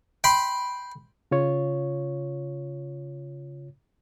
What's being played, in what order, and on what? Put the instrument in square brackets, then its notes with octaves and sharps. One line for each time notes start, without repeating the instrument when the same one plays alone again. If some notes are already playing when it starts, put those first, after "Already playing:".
[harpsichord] G5 B5 C6
[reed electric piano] C#3 F4 C#5